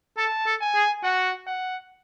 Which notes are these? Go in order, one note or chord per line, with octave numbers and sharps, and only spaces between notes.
A4 A5
A4
G#5
G#4
F#4 F#5
F#5